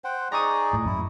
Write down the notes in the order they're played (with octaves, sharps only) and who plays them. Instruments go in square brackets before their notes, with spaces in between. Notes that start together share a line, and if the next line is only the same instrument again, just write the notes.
[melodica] C5 F#5 G5
[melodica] D#4 G#4 D5 [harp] A#5 C#6 D#6
[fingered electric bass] A2
[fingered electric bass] F#2 [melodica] E4